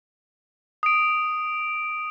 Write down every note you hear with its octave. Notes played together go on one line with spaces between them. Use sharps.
D#6 D7